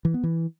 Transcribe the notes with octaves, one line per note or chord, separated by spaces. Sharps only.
E3
B3
E3